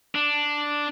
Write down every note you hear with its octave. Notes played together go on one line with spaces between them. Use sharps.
D4